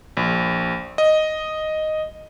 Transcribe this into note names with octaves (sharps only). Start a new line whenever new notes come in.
A#1
D#5